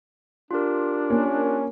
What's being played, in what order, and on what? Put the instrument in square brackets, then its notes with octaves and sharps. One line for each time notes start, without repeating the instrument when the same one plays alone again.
[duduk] D4 [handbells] F4 G4 A#4
[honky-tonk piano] A#3 [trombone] C#4